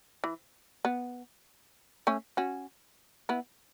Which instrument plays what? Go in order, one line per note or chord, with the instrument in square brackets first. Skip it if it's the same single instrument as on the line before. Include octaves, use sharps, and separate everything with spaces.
[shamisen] E3
B3
A3 C#4
C#4 F#4
B3 E4